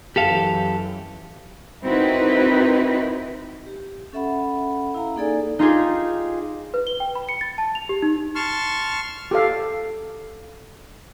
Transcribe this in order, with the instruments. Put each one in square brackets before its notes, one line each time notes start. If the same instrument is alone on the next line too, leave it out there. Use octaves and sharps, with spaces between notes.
[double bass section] F#2 E3 [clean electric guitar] G4 A4 F5
[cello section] C4 D#4 E4 F#4 A#4 B4
[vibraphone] G4
C#4 A4 E5 F#5 B5
E4 F5 A#5
A#3 D#4 G#4 A4 D5 G#5
[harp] D#4 F4 G4 G#4
[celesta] B4
G7
G5
B5
C#7
A6
A5
F7
G4
D#4
[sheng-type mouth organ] A5 C6 C#6 F6
[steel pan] G4 A4 F5